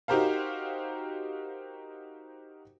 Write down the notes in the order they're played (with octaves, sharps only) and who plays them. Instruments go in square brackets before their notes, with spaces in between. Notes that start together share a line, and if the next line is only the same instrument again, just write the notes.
[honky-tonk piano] D#4 F#4 G4 A#4 C5 F5